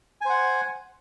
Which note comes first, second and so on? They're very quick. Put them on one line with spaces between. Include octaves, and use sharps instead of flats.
G#5 C5 F#5